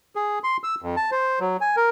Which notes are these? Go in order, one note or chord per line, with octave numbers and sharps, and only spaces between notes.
G#4
C6
E6
F2
A5
C5
F#3
G#5
A#4